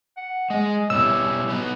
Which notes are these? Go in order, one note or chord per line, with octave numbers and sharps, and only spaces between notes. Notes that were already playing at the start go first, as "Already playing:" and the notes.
F#5
G#3 D#5
B2 G3 C#4 E4 E6
B3 D#4 F#4